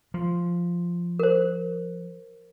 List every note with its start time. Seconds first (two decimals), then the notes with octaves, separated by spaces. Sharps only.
0.14 F3
1.19 A#4 C5